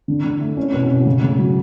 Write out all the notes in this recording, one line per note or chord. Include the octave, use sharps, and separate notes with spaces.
D3
D3
A3
C#4
B2
B2
C#3
C#3
F#3